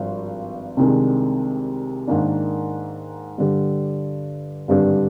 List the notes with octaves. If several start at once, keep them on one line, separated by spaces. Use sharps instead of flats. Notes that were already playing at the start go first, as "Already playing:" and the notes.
Already playing: G#1 G2 F3
C2 C3 D#3 G#3 D4
G#2 D#3 A#3 D4
G2 D3 G3
G#1 G2 D3 G3 D4